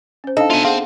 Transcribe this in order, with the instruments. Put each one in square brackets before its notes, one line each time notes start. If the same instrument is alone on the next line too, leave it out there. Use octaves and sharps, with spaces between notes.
[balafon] C#4 C5
[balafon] D4 D#4 [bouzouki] A4 [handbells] D#5 F5
[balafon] B3 D4 [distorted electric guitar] F4 G#5 [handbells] E5
[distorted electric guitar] C4 [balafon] G#4 [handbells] F5 F#5